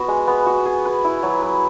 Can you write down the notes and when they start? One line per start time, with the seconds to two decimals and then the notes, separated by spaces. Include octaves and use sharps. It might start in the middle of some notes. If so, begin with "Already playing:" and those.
Already playing: B3 F#4
0.08 G#3
0.27 B3
0.46 F#4
0.65 G#4
0.85 B4
1.04 E4
1.23 F#3
1.42 B4